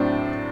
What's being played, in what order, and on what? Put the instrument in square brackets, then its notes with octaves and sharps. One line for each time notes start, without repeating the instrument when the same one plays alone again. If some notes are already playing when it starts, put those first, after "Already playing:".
Already playing: [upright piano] A2 F#3 C4 D4